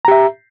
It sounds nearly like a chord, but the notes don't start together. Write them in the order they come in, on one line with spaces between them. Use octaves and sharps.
A#5 G4 E5